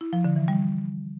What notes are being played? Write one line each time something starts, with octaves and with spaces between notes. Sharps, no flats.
E4
F3
D3
E3
G3